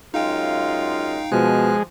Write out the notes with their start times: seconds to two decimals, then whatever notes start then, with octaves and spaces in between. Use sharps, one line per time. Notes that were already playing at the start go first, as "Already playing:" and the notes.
0.14 F#2 G#3 D#4 F4 F5 G5
1.32 B2 F3 G#3 G#5 F#6